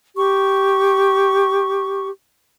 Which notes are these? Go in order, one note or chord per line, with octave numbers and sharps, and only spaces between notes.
G4 C#6